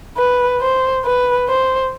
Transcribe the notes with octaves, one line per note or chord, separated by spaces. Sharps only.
B4
C5
B4
C5